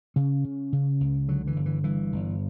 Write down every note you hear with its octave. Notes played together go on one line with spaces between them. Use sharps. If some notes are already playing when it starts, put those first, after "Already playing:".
C#3 C#4
C#3
C#3
C#2
D3 F#3
E3
G1
E3
G2 E3
G1